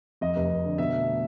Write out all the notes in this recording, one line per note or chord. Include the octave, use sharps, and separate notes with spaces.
F2 D#5
F1
F1
D3
B2 E5
A3